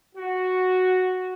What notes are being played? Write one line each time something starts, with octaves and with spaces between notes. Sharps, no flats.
F#4